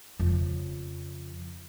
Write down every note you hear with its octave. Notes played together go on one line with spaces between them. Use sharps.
F2 C#3